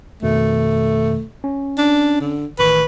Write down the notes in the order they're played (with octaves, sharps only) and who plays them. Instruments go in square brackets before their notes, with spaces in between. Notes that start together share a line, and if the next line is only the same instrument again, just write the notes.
[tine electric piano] F2 B2 D#3 [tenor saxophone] A3
[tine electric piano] C#4
[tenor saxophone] D4
D3
[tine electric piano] A1 D#3 C#6 [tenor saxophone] B4